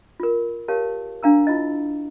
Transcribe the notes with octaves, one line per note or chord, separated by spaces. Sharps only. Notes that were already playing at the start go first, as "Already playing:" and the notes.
F4 A#4
G4 A#4 C#5 F5 A5
D4 F5 A#5 E6
E4 F4 D#5